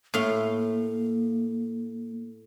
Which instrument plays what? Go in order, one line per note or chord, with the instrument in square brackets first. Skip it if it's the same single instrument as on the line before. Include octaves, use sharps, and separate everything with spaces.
[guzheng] A2 F5 C6 [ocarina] A#3